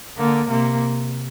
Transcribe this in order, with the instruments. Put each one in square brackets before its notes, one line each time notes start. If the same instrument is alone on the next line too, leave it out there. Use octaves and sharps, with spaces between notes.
[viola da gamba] D3 [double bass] A#3
[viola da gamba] C3 [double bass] A#3